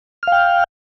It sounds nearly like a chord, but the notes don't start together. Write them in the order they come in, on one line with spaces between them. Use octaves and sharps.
F6 F5 G5